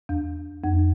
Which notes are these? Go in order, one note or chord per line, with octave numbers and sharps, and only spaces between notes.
E2
F2